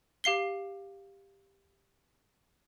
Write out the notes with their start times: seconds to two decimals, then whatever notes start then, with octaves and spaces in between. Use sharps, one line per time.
0.24 G4 F5 C7 G7